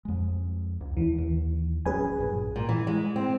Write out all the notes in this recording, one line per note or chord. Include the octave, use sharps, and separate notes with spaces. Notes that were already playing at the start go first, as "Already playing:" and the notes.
F2 G#3
C#2
D#2 E3
D#2
D1 F#3 C#4 G#4 B4 G#5
A#1 G2 A#2
A#2
E3
G#3
C4